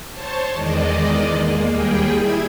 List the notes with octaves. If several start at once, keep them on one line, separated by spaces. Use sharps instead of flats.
C5 C#5 A5
E2 D#3 G#3 D5 D#5
G#3 A#3
D#2 G3 G#4 G5
E4 G#6